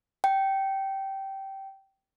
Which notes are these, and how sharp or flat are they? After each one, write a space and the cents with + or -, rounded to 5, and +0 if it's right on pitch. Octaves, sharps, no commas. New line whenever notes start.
G5 -15